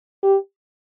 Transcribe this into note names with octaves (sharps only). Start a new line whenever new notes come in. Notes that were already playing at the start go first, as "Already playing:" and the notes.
G4